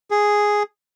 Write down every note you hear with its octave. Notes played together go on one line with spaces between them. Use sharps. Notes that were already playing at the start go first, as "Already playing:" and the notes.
G#4